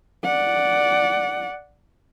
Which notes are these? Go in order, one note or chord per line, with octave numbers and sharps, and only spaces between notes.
D5 F#5